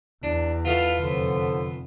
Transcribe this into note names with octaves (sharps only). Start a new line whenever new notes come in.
E2 D4
A3 B3 F4 F5 F6
F1 D3 F3